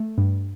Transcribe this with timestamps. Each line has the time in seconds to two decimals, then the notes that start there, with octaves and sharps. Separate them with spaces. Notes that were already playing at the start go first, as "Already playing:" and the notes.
Already playing: A3
0.18 G2